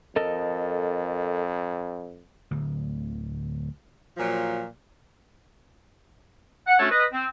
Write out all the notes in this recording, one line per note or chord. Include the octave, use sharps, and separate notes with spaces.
F2 A4 A#4 D#5
D1 D2
A#2 F3 F#3
F#5
A3 C#4 D4 F#4 A4 C#5
B4 D#5
C4